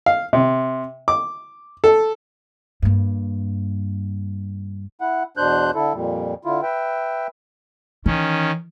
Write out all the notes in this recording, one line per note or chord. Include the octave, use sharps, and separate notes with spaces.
F5
C3
D6
A4
G2 A#3
E4 F#5
E2 B2 D4 C5 F#6 G6
D3 E4 A4
F2 A#2 G3
D3 E4 F4
B4 E5 G5
D#3 E3 C#4